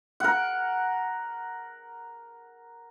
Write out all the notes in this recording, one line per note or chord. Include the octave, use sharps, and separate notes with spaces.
A#4 F#5